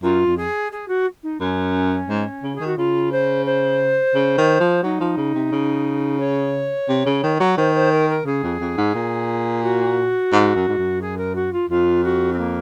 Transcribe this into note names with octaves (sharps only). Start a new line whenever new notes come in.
F#2 F4
F2
G#4
G#4
F#4
D#4
F#2 C#4
G#2
C#3
D#3 G#4
F#4
C#3 F4
C5
C5
C#3
D#3
F3
F#3 D#4
F3
C#3
C3
C#3
C#5
C3
C#3
D#3
F#3
D#3 C5
C5
A#4
A#4
C#3 G#4
F2
F2
G#2
A#2
F#4
G#2
F#2
G#2
F#2
G#4
A#4
F#4
F4
F2 F4
F#4
C4
A#3